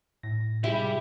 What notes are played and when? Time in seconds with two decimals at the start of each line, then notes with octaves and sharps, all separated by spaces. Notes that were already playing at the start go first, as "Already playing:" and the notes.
0.23 A2 A#6
0.64 C3 G3 E4 F4 G#4